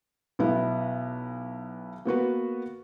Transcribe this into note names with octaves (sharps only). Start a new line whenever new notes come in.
B1 B3 E4
A#3 B3 F#4 B4